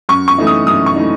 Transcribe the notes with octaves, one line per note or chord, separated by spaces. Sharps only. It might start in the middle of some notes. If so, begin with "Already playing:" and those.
F#2 C#6
C#6
E3 A3 D#4
D#6
F#2 D#6
C#6
E3 A3 D#4